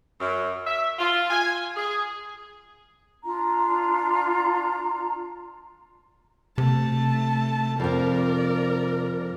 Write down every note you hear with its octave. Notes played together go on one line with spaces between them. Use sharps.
F#2
E5
F4
G#5
G#4
D4 F4 A#5
C3 A3 A5
F2 F3 A#4 D5